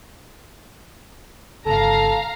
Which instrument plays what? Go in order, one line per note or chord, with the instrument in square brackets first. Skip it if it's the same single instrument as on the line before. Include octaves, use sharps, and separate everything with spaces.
[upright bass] G1 C#3 [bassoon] A4 [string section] F5 A#5